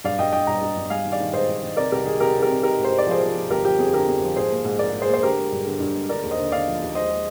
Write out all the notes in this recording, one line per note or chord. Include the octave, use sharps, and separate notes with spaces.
G2 D5 F5
G2 D#5 G5
G2 D#5 G5
G2 G5 A#5
G2
G2
G3 F5 G#5
D#3
D5 F5
D#3
G#2 C5 D#5
D#3
D#3
C3 A#4 D5
C2 G4 A#4
D#3 G#4
C2 G4 A#4
C2
G4 A#4
C3
D#4 G4 A#4
G#2
C5
D#4
D5
F3 G#4 C5
F3
F3
G1 G4 A#4
F3 G4
F2 G#4
D3 G4 A#4
F2
F3
G#2 G#4 C5
A#3
G#2
A#1 A#4 D5
G#2
G#4 C5
A#3
C5
D3 G4 A#4
G#3
G2
D3
G2
G#3
D3 A#4 D5
D#2
C5 D#5
D3
D3 D5 F5
F3
D#2
G#3 C5 D#5
G#3